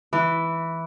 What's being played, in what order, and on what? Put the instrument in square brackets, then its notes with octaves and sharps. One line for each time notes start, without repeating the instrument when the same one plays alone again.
[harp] E3